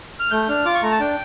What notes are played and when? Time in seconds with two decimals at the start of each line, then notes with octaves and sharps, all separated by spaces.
0.20 F6
0.31 A3 G6
0.48 D4 F6
0.65 F4 D6
0.74 C#6
0.82 A3 A#5
0.91 A5
1.00 D4 G5